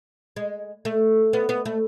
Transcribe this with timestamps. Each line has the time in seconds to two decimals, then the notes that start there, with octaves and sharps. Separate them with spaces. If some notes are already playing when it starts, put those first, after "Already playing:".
0.36 G#3
0.85 A3
1.33 B3
1.49 B3
1.65 A3